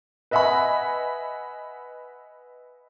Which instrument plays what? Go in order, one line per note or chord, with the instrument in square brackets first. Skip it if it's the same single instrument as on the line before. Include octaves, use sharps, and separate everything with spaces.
[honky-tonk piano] B4 D#5 E5 F#5 G#5 B5